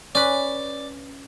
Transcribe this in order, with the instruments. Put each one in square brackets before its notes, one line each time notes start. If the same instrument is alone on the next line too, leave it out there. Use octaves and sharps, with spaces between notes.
[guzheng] C#4 B4 [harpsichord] D5